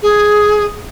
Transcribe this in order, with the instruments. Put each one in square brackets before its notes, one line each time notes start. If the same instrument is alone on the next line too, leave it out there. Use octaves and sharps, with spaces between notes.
[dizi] G#4